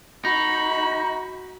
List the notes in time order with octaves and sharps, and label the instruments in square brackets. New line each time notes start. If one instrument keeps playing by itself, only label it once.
[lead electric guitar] D#4 [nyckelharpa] F#4 B5